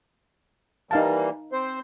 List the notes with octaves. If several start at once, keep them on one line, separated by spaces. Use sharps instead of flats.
E3 G3 A#3 D#4 F5 A5
C4 C5